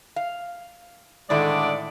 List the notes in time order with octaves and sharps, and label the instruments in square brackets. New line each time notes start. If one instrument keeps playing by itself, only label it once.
[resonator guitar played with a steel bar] F5
[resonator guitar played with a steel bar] A2 D#3 A3 [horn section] D3 G#3 [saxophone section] D5